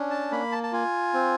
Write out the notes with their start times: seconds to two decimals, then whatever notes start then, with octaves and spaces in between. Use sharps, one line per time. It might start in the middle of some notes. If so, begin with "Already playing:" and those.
Already playing: C#4 D4
0.10 A5
0.31 A#3 B5
0.52 A5
0.63 A5
0.73 F4 G#5
1.14 C4